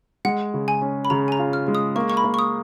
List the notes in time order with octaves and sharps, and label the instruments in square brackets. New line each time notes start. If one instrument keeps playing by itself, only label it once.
[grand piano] G#3 [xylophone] F#5
[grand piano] C#3
[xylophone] G#5
[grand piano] C#4
[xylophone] B5
[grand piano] C#3 [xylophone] A#5
[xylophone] G#5
A#5
[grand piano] F4
[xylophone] F6
[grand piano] G#3
[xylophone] D#6
[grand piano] A#3 [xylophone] C#6
[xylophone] C#6
B5
[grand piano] A#3
[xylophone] C#6
D#6